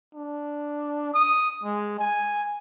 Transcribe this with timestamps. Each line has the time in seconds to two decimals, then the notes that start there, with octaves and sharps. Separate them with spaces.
0.14 D4
1.14 D#6
1.64 G#3
1.99 G#5